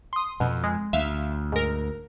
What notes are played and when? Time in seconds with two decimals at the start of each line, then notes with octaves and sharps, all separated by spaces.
0.13 C6 D#6
0.40 F2 B2
0.64 G#3
0.93 D2 E5 F5
1.52 G#2 A#4